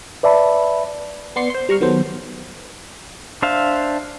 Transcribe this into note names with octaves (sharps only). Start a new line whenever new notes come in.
B4 D5 E5 A5 B5
B3 D5 C6 C7 C#7
C5 C6
G3 A#5 C#6 F6
D#3 F#3 B3 A4 C5
D4 C5 E5 F5